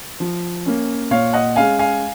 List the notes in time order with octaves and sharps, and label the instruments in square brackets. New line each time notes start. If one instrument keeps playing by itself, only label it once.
[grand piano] F3
A#3 C#4
A#2 C#5 F5
D#5 F#5
G#3 C#4 F5 G#5
F5 G#5